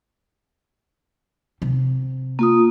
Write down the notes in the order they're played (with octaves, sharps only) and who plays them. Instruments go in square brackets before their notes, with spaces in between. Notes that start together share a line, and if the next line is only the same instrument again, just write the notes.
[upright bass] C3
[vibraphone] A#3 F4 D#6